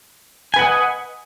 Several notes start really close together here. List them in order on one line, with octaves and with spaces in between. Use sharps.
G#5 B4 F#5 D#5